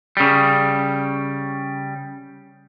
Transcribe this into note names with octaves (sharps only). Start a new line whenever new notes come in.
C#3 G3